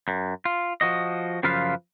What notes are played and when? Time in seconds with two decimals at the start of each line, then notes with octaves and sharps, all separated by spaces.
0.08 F#2
0.45 F4
0.81 F3 F#4 D#5
1.43 F#2 C#3 F3 F4 B4 F5